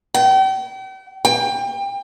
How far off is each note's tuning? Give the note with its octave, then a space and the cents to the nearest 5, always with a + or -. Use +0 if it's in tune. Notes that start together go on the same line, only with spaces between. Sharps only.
G5 -40
G5 +25